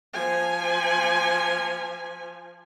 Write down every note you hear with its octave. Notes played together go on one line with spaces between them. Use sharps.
F3 G#5